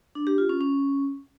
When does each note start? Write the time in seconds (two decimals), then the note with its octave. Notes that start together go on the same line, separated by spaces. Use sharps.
0.15 D4
0.27 G4
0.38 F4
0.49 C#4
0.61 C#4